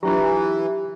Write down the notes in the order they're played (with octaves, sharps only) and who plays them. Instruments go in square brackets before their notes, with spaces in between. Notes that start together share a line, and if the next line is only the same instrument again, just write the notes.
[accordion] E3 [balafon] F#3 D4 F4 [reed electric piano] G4 [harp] A#5 B5